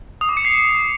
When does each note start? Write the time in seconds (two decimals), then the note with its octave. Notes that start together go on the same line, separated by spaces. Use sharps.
0.21 D#6
0.29 D6
0.37 C#7
0.45 C7